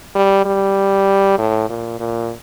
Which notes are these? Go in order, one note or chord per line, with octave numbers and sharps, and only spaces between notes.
G3
G3
A2
A#2
A#2